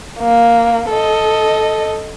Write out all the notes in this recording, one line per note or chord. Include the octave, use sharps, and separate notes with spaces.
A#3
A4 D#5